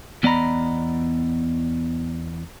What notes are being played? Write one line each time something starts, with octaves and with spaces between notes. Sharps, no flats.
E2 B3 D5 D#5 A#5 B5